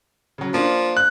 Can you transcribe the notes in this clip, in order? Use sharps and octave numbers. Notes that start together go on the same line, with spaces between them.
C#3 F#3
F3 A#3 D4
F#6